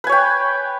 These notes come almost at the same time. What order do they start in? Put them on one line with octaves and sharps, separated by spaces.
B4 G#5 C#5 G5